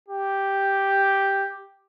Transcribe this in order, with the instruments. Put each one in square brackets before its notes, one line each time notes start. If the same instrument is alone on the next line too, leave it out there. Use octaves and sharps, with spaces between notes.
[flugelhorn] G4